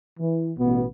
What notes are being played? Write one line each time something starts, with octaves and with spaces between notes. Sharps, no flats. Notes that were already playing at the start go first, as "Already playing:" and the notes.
E3
A1 B2 B3